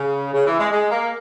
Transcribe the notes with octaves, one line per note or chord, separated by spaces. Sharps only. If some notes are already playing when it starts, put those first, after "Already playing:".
Already playing: C#3
C#3
E3
G#3
G#3
A#3